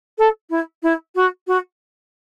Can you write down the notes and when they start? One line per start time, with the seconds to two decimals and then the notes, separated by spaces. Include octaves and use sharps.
0.18 A4
0.50 E4
0.83 E4
1.15 F#4
1.47 F#4